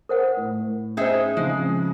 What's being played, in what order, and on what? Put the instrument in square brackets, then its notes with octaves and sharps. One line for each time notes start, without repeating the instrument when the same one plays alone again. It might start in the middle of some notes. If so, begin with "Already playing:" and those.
[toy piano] A#4 C5 F#5
[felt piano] A2
[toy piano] C#4 C5 [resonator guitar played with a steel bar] D#4 G#4 E5
[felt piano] C#3 F3 C4 [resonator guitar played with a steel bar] G#3